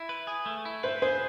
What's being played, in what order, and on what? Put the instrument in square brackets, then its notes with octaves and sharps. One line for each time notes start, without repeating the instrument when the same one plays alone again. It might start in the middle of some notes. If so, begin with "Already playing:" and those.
Already playing: [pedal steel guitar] E4
B4
G#4
A3
E4
[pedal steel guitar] B4 [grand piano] C5
[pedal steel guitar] G#4 [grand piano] C5